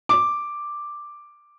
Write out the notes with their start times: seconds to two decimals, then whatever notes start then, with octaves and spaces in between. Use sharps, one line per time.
0.09 D6